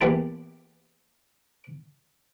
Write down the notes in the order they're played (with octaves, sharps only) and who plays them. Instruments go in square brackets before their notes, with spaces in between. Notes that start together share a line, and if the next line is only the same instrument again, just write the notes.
[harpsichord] E2 A#2 E3 G4 G5 A5